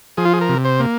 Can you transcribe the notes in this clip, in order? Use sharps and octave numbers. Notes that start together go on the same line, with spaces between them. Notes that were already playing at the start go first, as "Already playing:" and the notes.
F3 G#4
F4
G#4
A#4
C3
C5
A#3